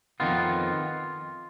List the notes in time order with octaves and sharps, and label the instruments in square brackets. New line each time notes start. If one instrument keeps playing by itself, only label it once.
[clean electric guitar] F2 D#3 B3 F4